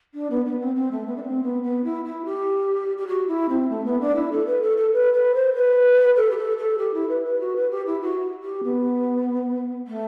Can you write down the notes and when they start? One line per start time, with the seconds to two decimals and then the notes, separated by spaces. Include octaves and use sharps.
0.14 D4
0.30 B3
0.45 B3
0.60 C4
0.76 C4
0.92 A3
1.07 B3
1.16 D4
1.23 C4
1.43 B3
1.63 B3
1.84 E4
2.05 E4
2.25 G4
2.98 G4
3.07 F#4
3.28 E4
3.49 C4
3.70 A3
3.85 B3
4.00 D4
4.15 E4
4.32 A4
4.47 B4
4.62 A4
4.78 A4
4.93 B4
5.14 B4
5.34 C5
5.55 B4
6.17 A4
6.31 G4
6.37 A4
6.58 A4
6.78 G4
6.94 E4
7.09 B4
7.24 B4
7.40 F#4
7.56 B4
7.71 G4
7.86 E4
8.02 F#4
8.43 G4
8.64 B3
9.87 A3